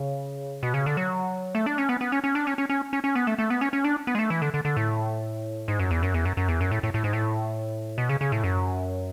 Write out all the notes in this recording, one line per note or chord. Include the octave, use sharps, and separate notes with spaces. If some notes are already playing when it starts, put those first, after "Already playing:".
Already playing: C#3
B2
C#3
D3
F#3
A3
D4
C#4
B3
B3
C#4
C#4
D4
C#4
C#4
C#4
C#4
C#4
B3
A3
A3
B3
C#4
C#4
D4
B3
G#3
A3
E3
D3
D3
D3
A2
G#2
F#2
E2
F#2
E2
F#2
F#2
E2
F#2
A2
A2
A2
G#2
A2
B2
C#3
C#3
A2
F#2